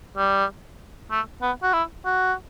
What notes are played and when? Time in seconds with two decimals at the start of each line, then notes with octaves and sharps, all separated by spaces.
0.17 G3
1.11 A3
1.42 B3
1.62 F#4
1.73 E4
2.05 F#4